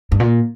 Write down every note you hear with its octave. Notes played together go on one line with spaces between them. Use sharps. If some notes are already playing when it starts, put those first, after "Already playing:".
G2
A#2